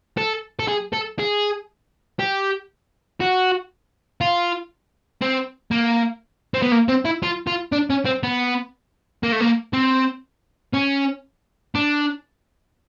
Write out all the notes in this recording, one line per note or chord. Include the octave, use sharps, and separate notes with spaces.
A4
A4
G#4
A4
G#4
G4
F#4
F4
C4
A#3
C4
B3
A#3
C4
E4
F4
F4
D4
C#4
C4
B3
A#3
A3
A#3
C4
C#4
D4